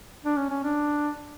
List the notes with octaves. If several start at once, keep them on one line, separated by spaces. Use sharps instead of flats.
D4
C#4
C#4
D4